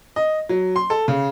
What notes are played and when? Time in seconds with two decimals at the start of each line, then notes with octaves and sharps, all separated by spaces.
0.16 D#5
0.49 F#3
0.76 C6
0.90 A4
1.08 C#3